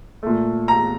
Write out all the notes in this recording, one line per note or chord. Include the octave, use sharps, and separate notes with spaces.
A#2 A3
A#5